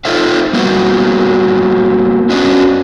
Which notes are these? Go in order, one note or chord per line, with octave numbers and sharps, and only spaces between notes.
D#4 F4 A4 C5 E5 F5
G3 A#3 B3 F#4
F#2 C#4 D4 F#4 D#5